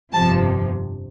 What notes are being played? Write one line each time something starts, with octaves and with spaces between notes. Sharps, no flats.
G1 F2 C3 F3 A5